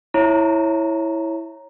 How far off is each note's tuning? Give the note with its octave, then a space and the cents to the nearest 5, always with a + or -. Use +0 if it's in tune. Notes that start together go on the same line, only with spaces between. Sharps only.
E4 -5 C#5 -10 A#5 +5